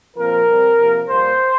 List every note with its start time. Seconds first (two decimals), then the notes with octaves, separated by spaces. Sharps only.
0.16 A#2 F3 C4 A#4
0.47 C3 G3 C4
0.78 C3 F3 A#3
1.08 A#2 G3 A#3 C5